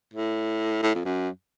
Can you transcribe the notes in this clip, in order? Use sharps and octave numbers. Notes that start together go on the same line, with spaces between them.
A2
A2
F2
F#2